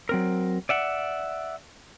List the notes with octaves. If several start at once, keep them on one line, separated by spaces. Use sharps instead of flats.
F#3 C4 A#4
D5 E5 F#5